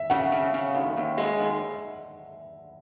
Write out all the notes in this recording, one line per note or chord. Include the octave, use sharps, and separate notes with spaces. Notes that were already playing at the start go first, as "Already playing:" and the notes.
Already playing: E5
C#3 F#5
C#3
C#3
D#2
D#2
G#3
D#2